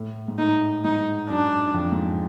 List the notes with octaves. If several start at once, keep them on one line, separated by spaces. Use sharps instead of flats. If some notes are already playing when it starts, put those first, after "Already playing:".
Already playing: A2
G#2
A2 D#4
G#2 D#4
F#2 D4
F2
G#2